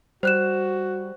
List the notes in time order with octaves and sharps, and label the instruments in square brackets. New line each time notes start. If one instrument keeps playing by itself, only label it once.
[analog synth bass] G3 [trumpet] F#4 [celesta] C5 F#6 E7